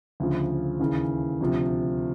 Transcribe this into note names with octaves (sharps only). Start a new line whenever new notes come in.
D2 C#3 F3
D#2 C#3 E3
D2 C3 F3